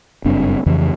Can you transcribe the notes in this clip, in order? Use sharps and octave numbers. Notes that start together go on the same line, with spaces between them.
F#1 G2 C4 D4
F2 C#3 E3